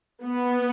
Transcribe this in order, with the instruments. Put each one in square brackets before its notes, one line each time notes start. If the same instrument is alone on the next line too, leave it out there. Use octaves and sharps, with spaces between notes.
[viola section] B3